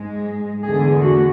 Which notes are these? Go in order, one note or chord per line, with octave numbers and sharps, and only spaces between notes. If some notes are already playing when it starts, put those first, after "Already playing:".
Already playing: G#2 G#3
E2 D3 A3 G#4
F#4